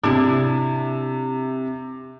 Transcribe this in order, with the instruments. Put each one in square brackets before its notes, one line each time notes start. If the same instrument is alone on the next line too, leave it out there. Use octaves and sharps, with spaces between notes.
[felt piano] C3 [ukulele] D4 E4